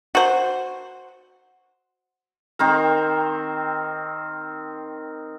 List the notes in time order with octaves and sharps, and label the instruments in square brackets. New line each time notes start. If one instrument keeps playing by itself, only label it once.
[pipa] F#4 C5
[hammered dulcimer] D#3 C4 A#4